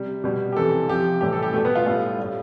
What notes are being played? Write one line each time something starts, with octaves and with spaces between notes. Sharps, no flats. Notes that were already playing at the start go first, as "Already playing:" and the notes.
Already playing: C3 G3
B2 G3
G4
C3 E3 G3 A4
C3 F3 G4
A2 E3 G3 G4
A4
G4
B2 G3 A3
B3
F4
A2 G3 F4
A2 G3